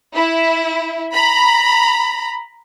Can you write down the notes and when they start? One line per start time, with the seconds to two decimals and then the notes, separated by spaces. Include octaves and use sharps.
0.14 E4
1.12 A#5 B5